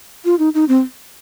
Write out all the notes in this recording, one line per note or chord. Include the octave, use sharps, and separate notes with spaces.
F4
D#4
D#4
C4